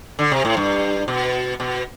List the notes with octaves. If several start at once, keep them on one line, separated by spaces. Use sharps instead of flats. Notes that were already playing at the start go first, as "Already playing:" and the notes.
D3
C3
A2
G2
B2
B2